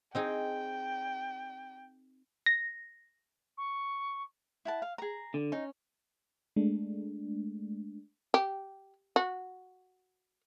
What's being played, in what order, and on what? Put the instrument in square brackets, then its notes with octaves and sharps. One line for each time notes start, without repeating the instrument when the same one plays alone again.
[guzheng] C4 D#4 G#4 [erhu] G5
[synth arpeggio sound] A#6
[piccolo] C#6
[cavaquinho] E4 F#5 A5
F5
G#4 A#5
[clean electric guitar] D3
[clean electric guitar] C#4 [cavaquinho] D#4
[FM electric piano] G#3 A3 D4
[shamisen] G4
F#4